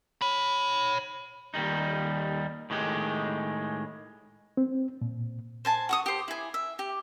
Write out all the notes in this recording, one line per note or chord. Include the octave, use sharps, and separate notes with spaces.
C#5 B5
D#2 D#3 G3 D#4
A2 D#3 G#3 G4
C4
A#2
C5 G#5 A5
F#4 C#6 D#6
G4 C5
E4 G#5
E5
G4